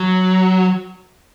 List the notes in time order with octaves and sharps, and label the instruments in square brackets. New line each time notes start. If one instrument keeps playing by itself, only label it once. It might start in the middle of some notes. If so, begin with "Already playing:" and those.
Already playing: [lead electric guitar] F#3